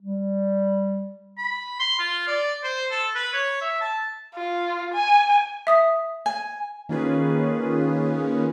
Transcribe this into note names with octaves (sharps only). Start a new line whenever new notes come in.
G3
B5
C6
F4
D5
C5
A4
B4
C#5
E5
A5
F4
G#5
E5 D#6 B6
G#5
D#3 A#3 C#4 F4 G#4 B4